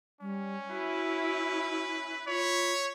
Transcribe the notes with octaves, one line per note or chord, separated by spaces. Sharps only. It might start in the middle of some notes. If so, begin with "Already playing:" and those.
G3 C#4
E4 F#4 B4
F4 C#5 B5